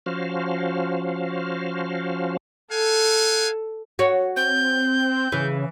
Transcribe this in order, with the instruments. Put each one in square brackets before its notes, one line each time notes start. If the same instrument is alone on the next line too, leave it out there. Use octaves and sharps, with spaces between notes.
[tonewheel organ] F3 C#4 F#4 C5 F5
[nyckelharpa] A4 [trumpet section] F5 F#5 G#5
[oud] F#4 C#5
[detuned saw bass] C4 [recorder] G6
[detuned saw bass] C#3 [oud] E3